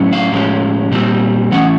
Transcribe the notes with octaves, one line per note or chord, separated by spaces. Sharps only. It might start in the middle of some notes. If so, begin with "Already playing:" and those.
Already playing: A2 F#3 A3 C#4
F5
A2 F3 G#3 C#4
A#2 G3 C4
E3 A3 C#4 F#5